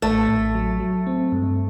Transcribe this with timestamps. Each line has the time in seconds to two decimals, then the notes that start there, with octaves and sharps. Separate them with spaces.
0.02 A1 A3
0.29 A1
0.55 F#3
0.80 F#3
1.07 C4
1.32 G2